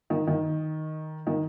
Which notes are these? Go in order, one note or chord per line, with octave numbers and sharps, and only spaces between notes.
D#3
D#3
D#3